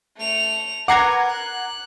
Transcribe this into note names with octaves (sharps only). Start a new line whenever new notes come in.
A3 F7
A#4 B4 F#5 A#5 D6 G#6 C7 C#7
F#6